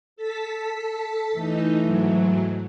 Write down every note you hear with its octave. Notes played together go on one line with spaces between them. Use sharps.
A4 A5 B6
E3 A3 D#4
G#2 F#3